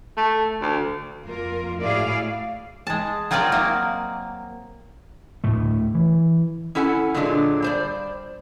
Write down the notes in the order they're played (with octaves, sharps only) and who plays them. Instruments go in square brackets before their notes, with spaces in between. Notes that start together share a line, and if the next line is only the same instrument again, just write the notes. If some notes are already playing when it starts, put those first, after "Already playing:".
[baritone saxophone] A3
D2
[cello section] F2 A#3 F4 A#4
A2 E4 F#4 G#4 D5 F5
[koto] G#3 A5
F#3 C4 F4 A#4 D5 D#5
F#3 A#3
[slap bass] D2 A2 A3
E3
[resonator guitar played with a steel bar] C#4 E4 A4 F#5 G#5
A#2 D3 F#3 G#3 D4 F4
G3 C5 D5